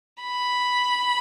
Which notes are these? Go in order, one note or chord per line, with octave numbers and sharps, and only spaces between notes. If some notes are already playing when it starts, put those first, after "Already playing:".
B5